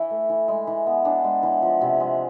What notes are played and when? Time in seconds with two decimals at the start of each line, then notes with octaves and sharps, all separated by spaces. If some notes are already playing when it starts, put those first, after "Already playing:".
Already playing: E3 E4
0.10 A3
0.29 E3
0.48 G#3
0.67 E3
0.86 B3
1.05 D4
1.24 G#3
1.43 E3
1.62 F3
1.81 C3
2.00 G#3